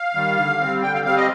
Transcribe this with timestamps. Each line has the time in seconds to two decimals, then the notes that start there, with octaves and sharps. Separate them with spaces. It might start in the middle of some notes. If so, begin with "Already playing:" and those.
Already playing: F5
0.15 D#3 G3
0.37 D3
0.60 G3 C4
0.82 D3 G5
0.94 F5
1.05 G3 C4 F5
1.16 D#5